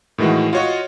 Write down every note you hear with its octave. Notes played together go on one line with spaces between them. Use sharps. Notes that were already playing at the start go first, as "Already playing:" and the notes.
A2 D#3 E3 G#3 F#4
F4 F#4 C#5 D#5 C#6